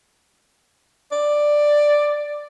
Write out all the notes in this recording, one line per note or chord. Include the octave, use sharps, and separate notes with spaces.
D5